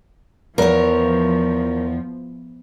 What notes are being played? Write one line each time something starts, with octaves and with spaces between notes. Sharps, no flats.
E2 F3 A#4 C#5